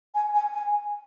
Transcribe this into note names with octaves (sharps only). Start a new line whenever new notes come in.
G#5
G#5
G#5